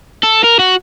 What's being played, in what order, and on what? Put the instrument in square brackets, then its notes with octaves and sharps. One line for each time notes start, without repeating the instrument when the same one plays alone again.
[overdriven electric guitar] A4
A#4
F#4